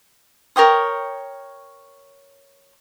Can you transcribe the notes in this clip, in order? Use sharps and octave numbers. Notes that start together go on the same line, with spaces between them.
A#4 C#5 G5 D#6